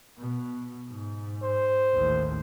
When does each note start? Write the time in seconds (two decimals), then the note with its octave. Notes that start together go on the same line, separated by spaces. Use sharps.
0.18 B2
0.90 G#2
1.42 C5
1.93 A1 D#2